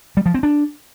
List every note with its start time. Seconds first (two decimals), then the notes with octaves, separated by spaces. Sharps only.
0.17 G3
0.26 F3
0.34 C4
0.43 D4